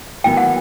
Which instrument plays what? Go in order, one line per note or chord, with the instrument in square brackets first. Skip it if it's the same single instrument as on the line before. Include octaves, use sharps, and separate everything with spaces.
[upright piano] D#2 D#3 F#3 B3 E4 [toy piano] G5
[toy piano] F#5